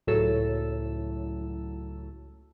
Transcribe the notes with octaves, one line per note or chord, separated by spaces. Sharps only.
C#2 A2 F#3 A4 A5 E6